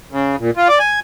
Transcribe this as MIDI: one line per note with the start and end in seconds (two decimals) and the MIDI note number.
0.12 0.36 49
0.40 0.51 46
0.57 0.68 65
0.68 0.79 74
0.79 1.00 80